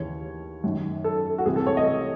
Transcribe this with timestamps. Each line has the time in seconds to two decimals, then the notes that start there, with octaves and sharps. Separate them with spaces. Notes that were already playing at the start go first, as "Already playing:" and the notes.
Already playing: D#2 C#3 E3 C#5
0.64 F#2 D#3
1.04 A4
1.38 F#4
1.46 C2 C3 E3 G#4
1.56 A4
1.67 C#5
1.77 D#5